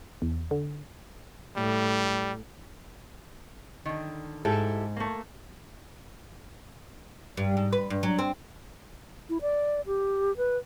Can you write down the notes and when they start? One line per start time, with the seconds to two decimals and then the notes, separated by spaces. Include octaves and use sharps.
0.22 E2
0.51 D3
1.57 A2 G3
3.85 D3 D#3
4.45 G#2 E4 G4 A4
4.96 A3 A#3
7.37 G2
7.57 G#2
7.72 B4
7.90 G2
8.03 F#3
8.19 C4
9.29 E4
9.42 D5
9.87 G4
10.37 B4